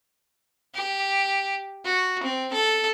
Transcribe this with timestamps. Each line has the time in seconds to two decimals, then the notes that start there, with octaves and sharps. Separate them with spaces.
0.75 G4
1.84 F#4
2.23 C4
2.53 A4